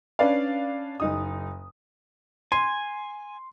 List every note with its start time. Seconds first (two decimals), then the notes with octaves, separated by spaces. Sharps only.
0.19 C#4 D4 B4 D5 F5
1.00 F#1 D#4 D#6
2.52 G#5 C6